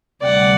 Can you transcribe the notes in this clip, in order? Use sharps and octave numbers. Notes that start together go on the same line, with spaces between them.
D2 C3 G3 D5 F#5